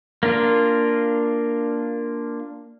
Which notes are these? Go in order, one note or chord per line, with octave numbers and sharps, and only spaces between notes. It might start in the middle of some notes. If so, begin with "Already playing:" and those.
A#3 D4 F4